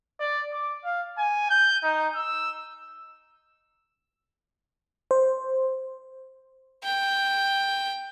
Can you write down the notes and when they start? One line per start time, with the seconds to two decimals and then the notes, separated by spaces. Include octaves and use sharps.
0.19 D5
0.52 D6
0.84 F5
1.18 G#5
1.50 G6
1.83 D#4
2.15 E6
5.11 C5
6.83 G5